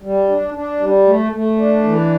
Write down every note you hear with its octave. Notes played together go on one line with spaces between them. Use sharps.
G3
D4
D4
G3
A3
A3
D4
E3